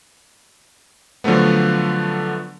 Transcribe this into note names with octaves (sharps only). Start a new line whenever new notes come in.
D3 F3 F#3 A3 B3